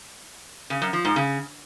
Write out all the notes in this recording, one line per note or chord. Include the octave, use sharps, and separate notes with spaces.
C#3
F#2
F3
G#2
C#3